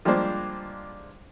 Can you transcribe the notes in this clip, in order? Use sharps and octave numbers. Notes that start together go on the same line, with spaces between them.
F3 G3 G#3 A#3 D4 C5